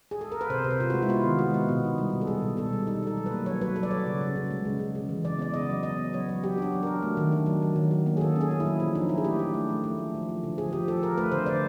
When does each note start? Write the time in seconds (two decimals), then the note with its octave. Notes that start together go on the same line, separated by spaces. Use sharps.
0.11 G#4
0.21 A4
0.32 A#4
0.41 B4
0.50 C3 C5
0.64 C3
0.70 B4
0.80 C3 F4
0.90 F#4
0.94 G#3
1.02 E4
1.09 B3 F4
1.24 D#3
1.39 G#3 F#4
1.54 B3
1.69 B2
1.84 D#4
1.98 G3
2.13 B2
2.21 A4
2.27 G3 G#4
2.42 B2
2.57 B2 A4
2.73 G3
2.87 D#4 A4
3.03 D#4 A4
3.17 F#3
3.26 B4
3.31 A#3
3.46 F#3 C#5
3.61 F#3 B4
3.76 F#3 A4
3.83 D5
3.90 F#3 C#5
4.06 C#3
4.21 C#3
4.36 C#3
4.51 G#3
4.65 C#3
4.79 C#3
4.95 C#3
5.09 E3
5.25 C#3 D5
5.39 B3 D5
5.54 C#3 D#5
5.69 F#3
5.83 B3 D#5
5.98 B3
6.13 F#3 C#5
6.29 F#3
6.43 F#3 G4
6.58 D4 F#4
6.73 F#3
6.83 D4 A#4
7.02 A3
7.17 D#3
7.32 D4
7.46 F#3
7.62 F#3
7.76 D#3
7.91 F#3
8.06 A#3
8.17 G#4
8.20 D#3 A4
8.36 C#4
8.41 G#4
8.51 A#3
8.60 E4
8.66 F#3
8.80 F3
8.95 D4 D#4
9.09 D4 E4
9.18 G#4
9.24 A3 G4
9.39 D4
9.54 A3
9.69 A3
9.84 A3
9.98 F3
10.14 F3
10.29 F3
10.43 D3
10.58 F3 G#4
10.73 F3 G4
10.88 F3 A4
11.02 F3 A#4
11.18 A3 B4
11.31 D3 C5
11.46 D3 D5